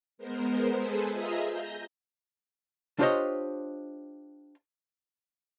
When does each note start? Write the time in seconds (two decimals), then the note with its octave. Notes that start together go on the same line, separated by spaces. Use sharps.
0.18 G#3 B3 A#4 C5
0.76 G#4 A4 B4 C5
1.10 F4 G#4 D#5 E5 A#5
1.46 G6 A#6
2.99 D4 F4 G4 C5 C#5 D#5